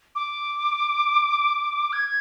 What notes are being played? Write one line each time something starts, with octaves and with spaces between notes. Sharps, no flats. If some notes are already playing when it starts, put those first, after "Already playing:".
D6
G#6